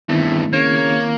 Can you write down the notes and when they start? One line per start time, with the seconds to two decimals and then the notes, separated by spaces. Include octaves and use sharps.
0.09 E2 G2 D#3 A3 C4 E4
0.53 C#3 A#3 C#5